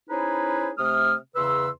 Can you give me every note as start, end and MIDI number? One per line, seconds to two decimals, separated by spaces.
0.10 0.71 61
0.10 0.71 63
0.10 0.71 64
0.10 0.71 68
0.10 0.71 71
0.10 0.71 72
0.78 1.15 48
0.78 1.15 57
0.78 1.15 87
0.78 1.15 89
1.36 1.69 40
1.36 1.69 49
1.36 1.69 71
1.36 1.69 84
1.36 1.69 88